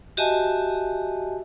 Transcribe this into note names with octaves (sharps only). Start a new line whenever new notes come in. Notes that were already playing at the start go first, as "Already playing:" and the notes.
F#4 G4 D#5 E5 G#5 A5